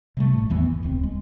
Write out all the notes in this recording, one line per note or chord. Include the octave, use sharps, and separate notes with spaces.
C3 G3 A3
A1 A2
E2 E3 B3
F#2
D1 C#2 C4
G#3